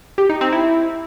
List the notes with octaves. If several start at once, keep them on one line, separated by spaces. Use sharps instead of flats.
G4
D#4
C4
E4